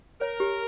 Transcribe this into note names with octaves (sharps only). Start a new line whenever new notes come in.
A#4 C#5
G4